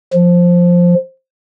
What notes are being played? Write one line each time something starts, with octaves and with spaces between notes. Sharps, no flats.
F3